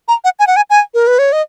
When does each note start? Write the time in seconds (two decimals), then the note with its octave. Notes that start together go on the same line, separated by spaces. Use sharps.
0.08 A#5
0.24 F#5
0.39 G#5
0.47 F#5
0.56 G#5
0.70 G#5
0.94 A#4
1.07 B4
1.19 C#5
1.32 D#5